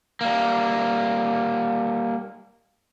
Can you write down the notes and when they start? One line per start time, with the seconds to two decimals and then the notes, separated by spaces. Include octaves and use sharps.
0.21 G3 A#3